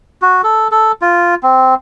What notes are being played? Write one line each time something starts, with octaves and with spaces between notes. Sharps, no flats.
F#4
A4
A4
F4
C4